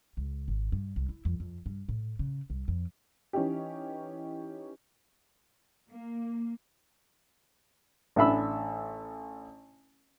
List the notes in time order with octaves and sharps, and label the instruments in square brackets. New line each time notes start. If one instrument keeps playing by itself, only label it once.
[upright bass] C#2
G#1
G2
C2
E4
F2
F2
G2
A2
C#3
C2
F2
[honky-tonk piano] E3 C#4 D#4 G4
[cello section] A#3
[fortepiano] A1 D4 E5 B5 E6